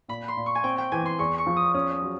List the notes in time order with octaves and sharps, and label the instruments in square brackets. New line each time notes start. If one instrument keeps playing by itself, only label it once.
[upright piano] A#2 [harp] B5
[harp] C6
[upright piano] A#2
[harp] C#6
G#5
[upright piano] C4 [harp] G5
[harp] G5
[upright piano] E3 [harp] G#5
[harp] C6
[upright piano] E2 [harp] C#6
[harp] C#6
[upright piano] F3
[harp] D#6
[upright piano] C#4 [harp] D#6
[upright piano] F#3